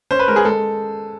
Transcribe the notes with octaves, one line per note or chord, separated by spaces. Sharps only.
C#4 C5
B4
G#3 A#4
G#4
G#3 A4